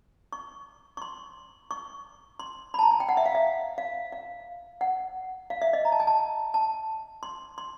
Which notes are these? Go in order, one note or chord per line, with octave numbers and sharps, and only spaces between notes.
C#6
C#6
C6
C#6
C6
B5
A5
A#5
G#5
G5
F#5
E5
F5
E5
F5
F5
F#5
F5
E5
D#5
A#5
A5
G#5
A5
A5
C6
C6